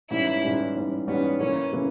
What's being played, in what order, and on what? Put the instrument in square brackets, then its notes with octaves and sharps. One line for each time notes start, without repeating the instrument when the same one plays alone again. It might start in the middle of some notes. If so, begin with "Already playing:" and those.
[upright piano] G#2 E3 G3 C#4 [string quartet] E4
[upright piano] G#2 E3 G3 C#4
G#2 E3 G3 C#4
[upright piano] G#2 E3 G3 C#4 [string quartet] B3
[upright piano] C#3 E3 A#3 [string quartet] C#4
[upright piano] C#3 E3 A#3